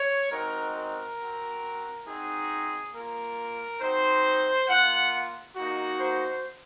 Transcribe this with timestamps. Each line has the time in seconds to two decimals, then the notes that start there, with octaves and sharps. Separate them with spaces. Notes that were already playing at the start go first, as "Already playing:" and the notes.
Already playing: C#5
0.30 G#3 C4 D#4 F#4 A#4
0.74 A#4
1.18 C4 F#4
2.06 C4 D#4 F#4 G#4
2.93 A#3 F4 A#4
3.80 C4 D#4 F#4 C5
4.68 A#3 F4 F#5
5.56 A#3 D#4 F#4
5.99 C5